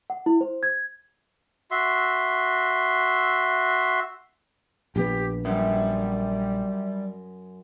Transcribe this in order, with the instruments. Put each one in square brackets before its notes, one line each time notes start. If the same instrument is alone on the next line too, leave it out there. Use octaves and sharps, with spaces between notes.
[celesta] F#5
E4
C5
G#6
[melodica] F#4 E5 C6
[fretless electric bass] A#1 B3 [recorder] G4
[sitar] F#2 [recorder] G3